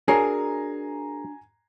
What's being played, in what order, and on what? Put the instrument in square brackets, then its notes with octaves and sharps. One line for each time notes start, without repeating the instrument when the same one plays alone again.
[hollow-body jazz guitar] D4 F#4 C#5 [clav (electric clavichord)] G#4 A#4 [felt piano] G#5 A#5 C7